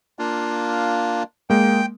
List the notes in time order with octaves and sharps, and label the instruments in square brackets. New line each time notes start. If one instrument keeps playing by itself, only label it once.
[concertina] A#3 D4 F4
[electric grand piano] G#3 A#3 [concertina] G5